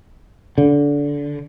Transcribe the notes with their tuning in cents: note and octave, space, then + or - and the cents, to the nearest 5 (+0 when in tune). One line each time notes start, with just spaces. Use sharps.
D3 -20